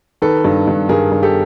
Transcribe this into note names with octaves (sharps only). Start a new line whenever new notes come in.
D#3 A4 B4
G2
G2
G2 G#4 A#4
G2
G4 A4